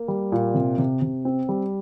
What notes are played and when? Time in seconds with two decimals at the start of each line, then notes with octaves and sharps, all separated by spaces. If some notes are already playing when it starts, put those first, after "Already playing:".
Already playing: A#3
0.08 G3
0.32 A#2
0.54 C3
0.78 C3
1.02 C3
1.25 C4
1.49 G3